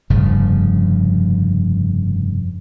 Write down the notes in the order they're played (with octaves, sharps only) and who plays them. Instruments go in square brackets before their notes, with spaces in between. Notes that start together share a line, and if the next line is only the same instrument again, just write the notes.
[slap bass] F1 G2 C#3 F3